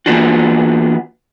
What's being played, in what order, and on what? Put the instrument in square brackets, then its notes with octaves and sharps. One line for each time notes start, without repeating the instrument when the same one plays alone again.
[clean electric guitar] E3 A#3 B3 D4 F4 F#4